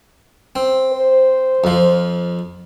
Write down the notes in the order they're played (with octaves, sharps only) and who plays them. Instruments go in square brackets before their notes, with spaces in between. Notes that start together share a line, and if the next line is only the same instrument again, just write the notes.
[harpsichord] C4
[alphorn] C5
[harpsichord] F2 F3